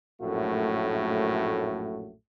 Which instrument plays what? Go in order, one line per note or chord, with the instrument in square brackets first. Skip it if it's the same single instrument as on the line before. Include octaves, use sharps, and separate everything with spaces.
[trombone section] A#1 F#2 A2 A3 F#4